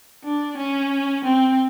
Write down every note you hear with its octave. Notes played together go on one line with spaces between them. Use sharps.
D4
C#4
C4